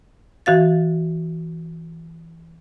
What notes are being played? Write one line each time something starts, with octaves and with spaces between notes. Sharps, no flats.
E3 F#4 F5 A6